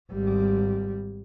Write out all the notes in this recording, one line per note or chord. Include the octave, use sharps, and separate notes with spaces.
G#1 G3